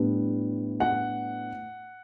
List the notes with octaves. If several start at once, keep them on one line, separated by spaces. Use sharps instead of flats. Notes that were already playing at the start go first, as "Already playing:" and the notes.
Already playing: A2 G3 B3 D4
F#5